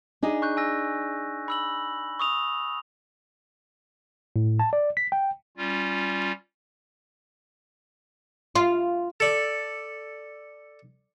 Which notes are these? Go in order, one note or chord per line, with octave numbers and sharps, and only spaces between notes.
D4 D#4 G#4
C#6 F#6 G6
G#5 E6 A#6
B5 E6 F#7
C#6 D#6 F7
A2
A5
D5
B6
G5
G3 C#4 F4
F4
A4 D5